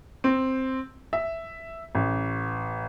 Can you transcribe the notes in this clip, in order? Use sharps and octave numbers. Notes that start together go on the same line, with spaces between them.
C4
E5
A1